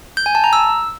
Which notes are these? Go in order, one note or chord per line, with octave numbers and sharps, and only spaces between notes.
G6
G#5
A5
A#5
E6